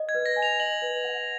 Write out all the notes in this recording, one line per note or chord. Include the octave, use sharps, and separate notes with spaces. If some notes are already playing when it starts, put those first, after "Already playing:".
Already playing: D#5
G#6
B4
A#6
G#5
F7
D#5 F#7
B4
F#5